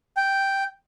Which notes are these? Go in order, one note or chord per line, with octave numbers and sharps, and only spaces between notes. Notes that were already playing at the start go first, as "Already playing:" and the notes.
G5